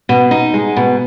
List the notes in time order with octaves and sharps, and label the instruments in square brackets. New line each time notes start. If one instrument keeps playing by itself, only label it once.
[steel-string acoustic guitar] B2
D#4
G#3
B2